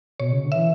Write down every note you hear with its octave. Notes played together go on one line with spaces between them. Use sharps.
B2 C#5
C#3
D3
E3 E5